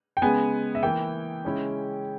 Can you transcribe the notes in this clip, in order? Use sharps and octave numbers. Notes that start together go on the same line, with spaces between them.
G5
C#3 G#3 B3 G#5
E5
E3 A#3 E4 G5
C#3 G#3 C#4 E4